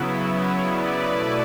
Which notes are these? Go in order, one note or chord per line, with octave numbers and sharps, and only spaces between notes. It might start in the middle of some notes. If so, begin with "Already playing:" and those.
Already playing: C#3 F#3 B3 E4
C#5
B4 D5
B2 A3 E4